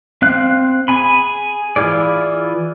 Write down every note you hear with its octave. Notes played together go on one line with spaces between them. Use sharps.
C4 F5 F#6
G#4 G#5 B5
E3 E4 F4 G#4 D5